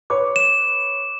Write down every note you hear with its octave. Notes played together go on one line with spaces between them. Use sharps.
B4 C#5 D6
E7